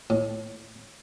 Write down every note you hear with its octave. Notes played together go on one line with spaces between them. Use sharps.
A2